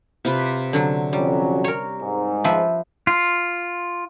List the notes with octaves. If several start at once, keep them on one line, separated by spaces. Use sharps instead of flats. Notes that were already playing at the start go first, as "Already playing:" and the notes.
C3 F4 B4
D3 F#3
F2 F#3 G3 C#4
A#4 C#5
G#2
F3 B4 E5
F4